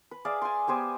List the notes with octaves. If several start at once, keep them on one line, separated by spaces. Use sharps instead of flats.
B4
G#4 D5 E5 F5
G#5 C6
B3 G4 C5 G#5